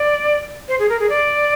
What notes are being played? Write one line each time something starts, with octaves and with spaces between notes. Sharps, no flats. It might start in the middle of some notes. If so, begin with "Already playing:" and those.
Already playing: D5
C5
G#4
A#4
G#4
D5